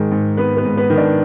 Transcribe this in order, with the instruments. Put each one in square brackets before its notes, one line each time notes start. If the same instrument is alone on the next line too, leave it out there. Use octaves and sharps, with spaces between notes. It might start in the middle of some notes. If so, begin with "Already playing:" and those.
Already playing: [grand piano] G#2 D#3 G#3 G#4
G#2
G#2 B3 B4
B3 B4
G#2
B3 B4
D#3
D4 D5